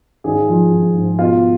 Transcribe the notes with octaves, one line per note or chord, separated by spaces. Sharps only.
G#1 G#4
F3
G#1
G#2
B2 F4